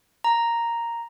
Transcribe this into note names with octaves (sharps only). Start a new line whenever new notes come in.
A#5